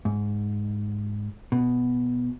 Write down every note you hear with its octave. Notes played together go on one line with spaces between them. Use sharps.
G#2
B2